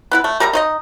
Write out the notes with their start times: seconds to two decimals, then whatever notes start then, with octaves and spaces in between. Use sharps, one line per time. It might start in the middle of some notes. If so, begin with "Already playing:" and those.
0.11 B3 E4 B4
0.24 A3
0.40 G3 A#4 E5 A#5
0.53 D#4 C5 D#5